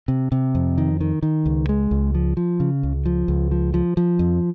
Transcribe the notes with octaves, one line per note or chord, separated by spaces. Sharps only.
C3
C3
F2
D#3
D#3
D#3
C#2
G#3
C#2
F3
F3
C#3
C#2
F3
C#2
F3
F3
F3
F2